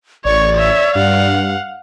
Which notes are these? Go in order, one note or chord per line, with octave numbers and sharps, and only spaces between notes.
A1 C#5 D5 C#6
C#5 E5
G2 F5 F#5